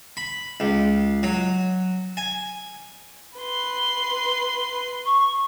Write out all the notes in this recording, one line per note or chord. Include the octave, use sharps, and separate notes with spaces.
B5
C#2
F#3
G#5
B4 C6
C#6